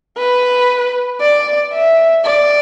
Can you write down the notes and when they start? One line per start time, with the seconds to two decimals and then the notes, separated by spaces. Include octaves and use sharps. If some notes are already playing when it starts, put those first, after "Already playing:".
0.18 B4
1.21 D5
1.73 E5
2.25 D5